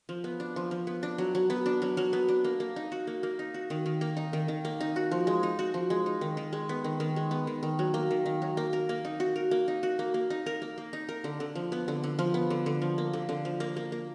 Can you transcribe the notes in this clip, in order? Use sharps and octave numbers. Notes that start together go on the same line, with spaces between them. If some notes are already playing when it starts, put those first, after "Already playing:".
F3
B3
D4
F3
F3
B3
D4
F#3
F#3
B3
D4
F#3
F#3
B3
D4
A#3
A#3
D#4
F#4
A#3
A#3
D#4
F#4
D#3
D#3
A#3
D#4
D#3
D#3
A#3
D#4
F#4
F3
G#3
D#4
F#4
F3
G#3
D#4
D#3
D#3
G#3
B3
D#3
D#3
G#3
B3
D#3
D#3
F#3
A#3
D#3
D#3
F#3
A#3
A#4
A#3
D#4
F#4
A#4
A#3
D#4
F#4
A#3
A#3
D#4
A#4
A#3
A#3
D#4
A#4
D3
D3
F3
B3
D3
D3
F3
B3
D3
D3
F3
A#3
D3
D3
F3
A#3
A#3
A#3